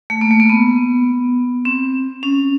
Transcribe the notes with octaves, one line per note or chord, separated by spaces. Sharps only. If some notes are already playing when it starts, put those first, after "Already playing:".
A3
A#3
A3
A#3
B3
C4
C#4